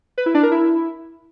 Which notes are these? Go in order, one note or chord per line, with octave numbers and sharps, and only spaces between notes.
B4
E4
D4
A#4
E4